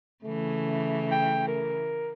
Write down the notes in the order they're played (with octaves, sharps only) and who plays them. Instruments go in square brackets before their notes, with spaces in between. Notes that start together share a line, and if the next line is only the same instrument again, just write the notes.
[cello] C#3 E3 [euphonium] A3
[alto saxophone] G5
A#4